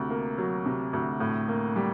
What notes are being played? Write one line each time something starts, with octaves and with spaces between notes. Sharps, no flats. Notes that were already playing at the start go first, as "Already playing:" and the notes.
Already playing: D2 C3
A#3
F#3
C3
D2
A2
A#3
G3